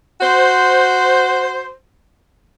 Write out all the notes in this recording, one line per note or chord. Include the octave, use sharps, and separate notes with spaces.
F#4 C5